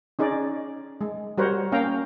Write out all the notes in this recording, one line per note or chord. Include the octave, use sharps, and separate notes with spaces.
C#4 D#4 G#4 D5
G#3
G3 F#4 A#4 C5 C#5 F#5
A#3 C#4 F5 G5 A#5